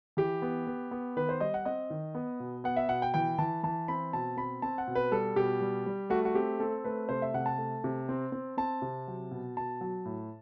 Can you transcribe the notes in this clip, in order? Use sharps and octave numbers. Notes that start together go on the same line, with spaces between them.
E3 G4
B3
B3
B3
D#3 B4
C5
G3 D#5
F#5
C4 D#5
D#3
B3
B2
B3 F#5
E5
B2 F#5
G5
E3 G5
E3 A5
E3 A5
C4 B5
B2 A5
C4 B5
C4 A5
F#5
B2
B4
G3 A4
B2 G4
G3
G3
A3 F#4
F#4
C4 G4
C4 A4
A3 B4
C3 C5
E5
C3 F#5
A5
A3
C3
C4
C4
C4 A5
C3
F#3
B2
B2 A5
F#3
A2